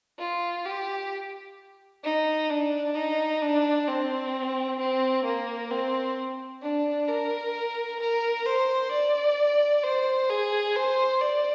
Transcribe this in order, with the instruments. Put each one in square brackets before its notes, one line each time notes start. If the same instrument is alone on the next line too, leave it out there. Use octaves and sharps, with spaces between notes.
[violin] F4
G4
D#4
D4
D#4
D4
C4
C4
A#3
C4
D4
A#4
A#4
C5
D5
C5
G#4
C5
D5